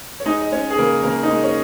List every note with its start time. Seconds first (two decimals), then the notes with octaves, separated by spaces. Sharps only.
0.20 C#5
0.26 G#3 D#4 D#5
0.41 D#5
0.52 G#3 C#4 C#5
0.70 G#4
0.78 C#3 A#3 A#4
1.03 C#3 A#3 A#4
1.23 D#4 D#5
1.30 G#3
1.44 C#4 C#5